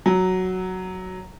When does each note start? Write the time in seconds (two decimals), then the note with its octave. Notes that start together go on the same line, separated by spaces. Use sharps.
0.06 F#3